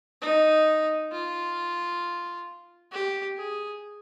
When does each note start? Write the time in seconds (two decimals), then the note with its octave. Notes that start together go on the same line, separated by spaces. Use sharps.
0.22 D#4
1.12 F4
2.92 G4
3.37 G#4